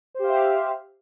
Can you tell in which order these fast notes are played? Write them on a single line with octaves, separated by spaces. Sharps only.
C5 G4 F5 E5